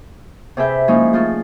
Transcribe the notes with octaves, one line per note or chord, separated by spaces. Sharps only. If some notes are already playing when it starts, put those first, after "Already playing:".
C3 G#4 B4 E5 G6
F3 G#3 A#3 C#4 D#4 E4
A3 F4 G#4 A4